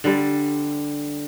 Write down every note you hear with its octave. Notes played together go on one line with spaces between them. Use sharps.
D3 G3